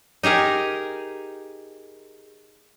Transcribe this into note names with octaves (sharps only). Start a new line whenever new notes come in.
D#4 G4 G#4 A#4